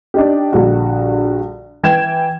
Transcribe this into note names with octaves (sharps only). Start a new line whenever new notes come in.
D4 D#4 G4
A#1 D3 G3 F#4
E3 G5 G#6 E7